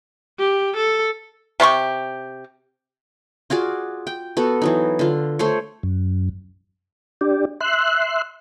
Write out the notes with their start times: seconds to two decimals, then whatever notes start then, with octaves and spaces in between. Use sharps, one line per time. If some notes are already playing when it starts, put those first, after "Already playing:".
0.39 G4
0.76 A4
1.60 C3 G4 C6 C#6
3.50 F4 F#4 G#4 D5
4.07 G5
4.37 B3 F#4 A4
4.62 E3 F#3 D#4
4.99 D3 F4
5.39 A3 C5 C#5
5.83 F#2
7.21 D4 G4
7.61 E5 C6 F#6